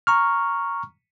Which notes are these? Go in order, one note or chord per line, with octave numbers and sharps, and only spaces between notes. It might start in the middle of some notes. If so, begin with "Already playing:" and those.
A#5 C#6 F6